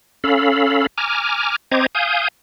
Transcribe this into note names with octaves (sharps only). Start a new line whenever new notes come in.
C#4 A4 F5 B5
G#5 A#5 D6 F6
C4 C5 D#5 A#5 D6 G#6
F5 G#5 D#6 G6